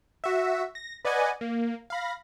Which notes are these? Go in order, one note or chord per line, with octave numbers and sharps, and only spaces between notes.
F#4 E5
A#6
B4 D5 D#5 F#5 G#5
A#3
F5 B5 A#6